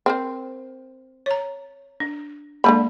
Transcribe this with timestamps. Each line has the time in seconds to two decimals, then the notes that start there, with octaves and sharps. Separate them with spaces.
0.06 C4 A#4 C5
1.26 C#5 A#5
2.00 D4
2.64 D3 D#3 G#3 A#3 A5 B5